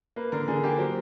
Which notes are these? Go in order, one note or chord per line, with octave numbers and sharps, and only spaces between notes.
A#3 B4
D3 A#4
D3 G#4
A#3 G4
F#3 C5